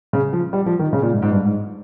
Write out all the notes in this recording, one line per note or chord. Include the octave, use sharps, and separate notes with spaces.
C#3
F3
G3
F3
D#3
C#3
A#2
G#2
G#2
G2
G#2